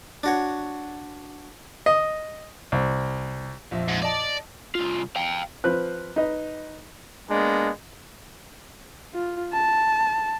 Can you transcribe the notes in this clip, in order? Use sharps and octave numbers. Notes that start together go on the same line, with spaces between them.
D4 F#4 C#5
D#5
C2
A#1 F2 E5
G#2
D5 D#5 A5
C2 F4
F5 G5
F3 C4 B4 F#6
D#4 B4 D#5
G#3 A#3 B3 D4
F4
A5